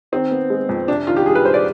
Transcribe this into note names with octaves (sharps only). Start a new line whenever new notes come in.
D#3 C4
B3
G#3
F2
C3 D4
D#3 F4
G4
G3 G#4
B4
G3 C5
D5